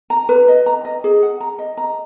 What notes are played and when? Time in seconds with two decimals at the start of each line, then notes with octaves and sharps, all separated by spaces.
0.10 A#5
0.29 B4
0.48 D#5
0.66 A#5
0.85 D#5
1.04 G#4
1.23 F#5
1.41 A#5
1.59 D#5
1.77 A#5